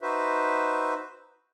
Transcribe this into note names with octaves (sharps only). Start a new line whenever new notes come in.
D#4 F#4 B4 C5 E5